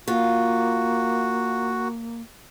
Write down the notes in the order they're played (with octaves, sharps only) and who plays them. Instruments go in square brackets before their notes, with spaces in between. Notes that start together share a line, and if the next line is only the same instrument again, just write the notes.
[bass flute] A#3 [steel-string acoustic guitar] F4 [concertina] F#4